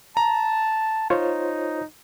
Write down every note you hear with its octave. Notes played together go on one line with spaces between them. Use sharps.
A5 A#5
D#4 F4 C5 C#5